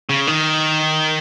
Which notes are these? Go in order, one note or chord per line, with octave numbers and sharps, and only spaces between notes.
C#3
D#3